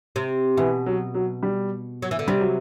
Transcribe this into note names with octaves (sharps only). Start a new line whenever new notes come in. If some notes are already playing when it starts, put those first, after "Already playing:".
C3
B2 E3
F#3
F#3
G3
F#3
E3
D3
C3 G3
F#3